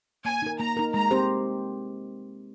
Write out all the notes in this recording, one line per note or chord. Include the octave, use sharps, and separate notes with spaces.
A#3 G#5
D#4 A#4
A#3 A#5
D#4 A#4
G#3 A#5
C4 G4 C5